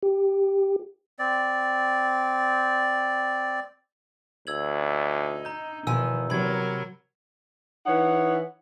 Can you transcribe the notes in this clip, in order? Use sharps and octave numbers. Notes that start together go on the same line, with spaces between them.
G4
C4 D5
D2 E6 G#6 F#7
D#4
A#5 G6
E2 B2 D#3 F3 G#5 E6
C3 F#3 A#4 B5 G#6
E3 D#4 C#5 F#5